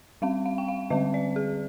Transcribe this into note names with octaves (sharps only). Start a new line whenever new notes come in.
G3 C4 F5
F5
G5
F5
D3 G3 C4 D#5
D5
G#4